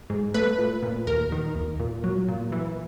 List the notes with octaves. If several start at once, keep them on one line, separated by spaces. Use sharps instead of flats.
G#2
A3 B4
A#2
A#2
D#2 A#4
D#3
D#2
A#2
F#3
A#2
E3